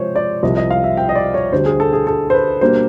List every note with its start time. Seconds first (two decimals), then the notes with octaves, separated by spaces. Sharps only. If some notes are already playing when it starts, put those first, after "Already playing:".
Already playing: C3 F3 G#3 C5 C#5
0.16 D5
0.43 C2 C3 F3 D#5
0.57 D#5
0.70 F5
0.84 E5
0.97 G5
1.09 D#5
1.15 D5
1.34 C#5
1.52 D2 D3 G3 C5
1.66 G#4
1.80 A4
1.93 G#4
2.07 A4
2.30 C5
2.34 B4
2.61 B2 G3 A#3 D4 C5